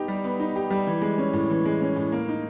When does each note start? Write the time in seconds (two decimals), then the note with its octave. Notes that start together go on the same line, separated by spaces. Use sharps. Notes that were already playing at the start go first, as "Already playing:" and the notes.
Already playing: B3 D#4 G4
0.08 G3
0.24 B3
0.40 D#4
0.56 G4
0.70 G3
0.87 E3
1.02 G#3
1.18 C#4
1.33 A2
1.50 E3
1.66 G#3
1.81 C#4
1.96 A2
2.12 A#3
2.28 D#4